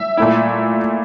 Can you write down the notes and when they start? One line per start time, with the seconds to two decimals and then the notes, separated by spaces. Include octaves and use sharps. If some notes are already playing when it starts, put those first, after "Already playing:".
Already playing: E5
0.17 A#2 A3 E4